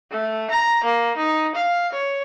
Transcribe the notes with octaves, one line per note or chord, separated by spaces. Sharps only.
A3
A#5
A#3
D#4
F5
C#5